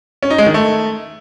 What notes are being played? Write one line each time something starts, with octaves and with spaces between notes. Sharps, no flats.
C#4
D#4
G#3
D#3
A3